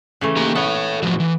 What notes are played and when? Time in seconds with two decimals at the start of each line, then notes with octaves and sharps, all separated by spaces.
0.21 C#3 E3 A3
0.36 A#3 G4 A#5
0.55 B3 A4 C#5
1.03 A2 F3 F#3
1.20 E3